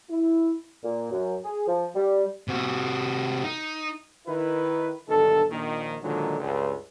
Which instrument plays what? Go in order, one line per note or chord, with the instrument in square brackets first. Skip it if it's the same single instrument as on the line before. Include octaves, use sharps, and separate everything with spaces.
[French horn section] E4
[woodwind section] A#2
F#2
G#4
F3
G3
[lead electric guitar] C3 F#4
D#4
[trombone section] D#3 E4 B4
B1 G2 D3 D#3 A4
A#1 A#2 D#3
A#2 D3 D#3 F3 F#3 G#3
C#2 G2